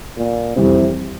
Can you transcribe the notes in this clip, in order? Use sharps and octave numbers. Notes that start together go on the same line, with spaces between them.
A#2
F2 C3 E3 G3 C4